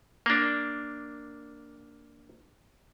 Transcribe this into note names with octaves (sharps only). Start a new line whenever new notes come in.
A#3 D4